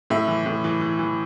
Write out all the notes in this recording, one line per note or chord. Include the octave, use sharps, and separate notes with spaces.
A2 E5
E3
A2
E3
E3
E3